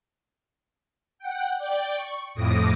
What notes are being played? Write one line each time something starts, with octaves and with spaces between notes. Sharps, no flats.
F#5 G5
D5 G5
C#6
F2 A2 D6 D#6 A#6